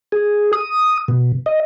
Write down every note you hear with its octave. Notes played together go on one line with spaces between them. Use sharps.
G#4
D#6
B2
D#5